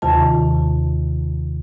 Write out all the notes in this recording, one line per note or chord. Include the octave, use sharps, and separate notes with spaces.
D#2 C3 D#3 F4 A5